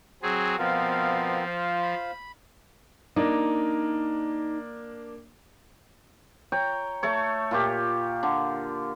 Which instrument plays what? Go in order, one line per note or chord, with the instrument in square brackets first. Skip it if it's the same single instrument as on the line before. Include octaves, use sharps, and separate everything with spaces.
[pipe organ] F#3 C4 G#4
[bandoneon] B2 F5 [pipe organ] F3 [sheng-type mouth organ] B3 C4 A#4
[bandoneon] F4 C5 F5
[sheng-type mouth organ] B5
[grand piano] A#3 D4 [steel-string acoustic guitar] D#4
[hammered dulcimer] C#5 G5 A#5
A3 A4 C#5
A#2 F4 G4
D3